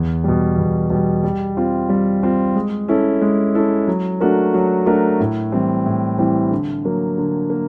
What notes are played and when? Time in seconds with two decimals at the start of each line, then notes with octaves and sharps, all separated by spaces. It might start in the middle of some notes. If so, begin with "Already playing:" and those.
Already playing: E2
0.24 B2 G3
0.57 E2
0.90 B2 G3
1.24 G3
1.57 C4 F4
1.89 G3
2.23 C4 F4
2.55 G#3
2.88 C#4 E4 A4
3.21 G#3
3.55 C#4 E4 A4
3.88 F#3
4.20 A3 D4 F#4 A#4
4.54 F#3
4.86 A3 D4 F#4 A#4
5.20 A2
5.52 E3 G3 C4
5.86 A2
6.18 E3 G3 C4
6.51 D3
6.85 F#3 A#3
7.18 D3
7.50 A#3